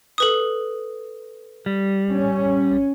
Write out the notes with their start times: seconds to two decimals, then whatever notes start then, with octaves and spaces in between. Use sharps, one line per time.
0.18 A4 B4 D#6
1.66 G3
2.10 C#4